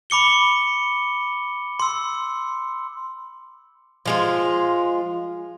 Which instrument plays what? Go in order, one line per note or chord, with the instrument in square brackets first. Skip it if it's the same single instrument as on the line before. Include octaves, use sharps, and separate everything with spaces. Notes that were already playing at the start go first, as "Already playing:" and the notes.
[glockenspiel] B5 D6 C#7 G7
C6 E6
[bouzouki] F3 G#3 F4